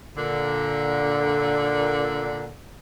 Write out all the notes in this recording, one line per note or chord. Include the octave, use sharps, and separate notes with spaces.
A#2 D3